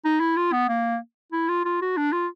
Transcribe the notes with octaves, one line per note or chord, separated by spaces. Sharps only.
D#4
E4
F4
B3
A#3
E4
F4
F4
F#4
D4
F4